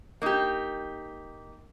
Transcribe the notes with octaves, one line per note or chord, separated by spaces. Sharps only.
A#3 D#4 G4